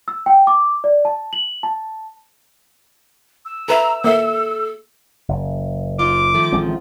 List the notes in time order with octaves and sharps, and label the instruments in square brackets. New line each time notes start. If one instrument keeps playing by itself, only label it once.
[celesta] E6
G5
D6
D5
A5
F#7
A5
[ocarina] E6
[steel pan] A4 B4 E5 [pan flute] A#5
[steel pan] A#3 E5 [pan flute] A4
[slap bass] F#1
[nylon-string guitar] D#4 F4 [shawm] D6
[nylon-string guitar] D#3 F3 A3
[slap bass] A1 G#3 C4